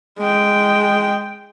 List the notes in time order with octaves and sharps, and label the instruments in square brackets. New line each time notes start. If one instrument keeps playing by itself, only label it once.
[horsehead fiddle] G#3 G5